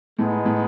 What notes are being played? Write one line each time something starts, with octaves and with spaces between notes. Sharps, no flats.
A2 G#3 A3 B3 D#4
A2 A3